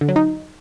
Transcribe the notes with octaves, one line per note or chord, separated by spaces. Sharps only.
D3
F#3
D#4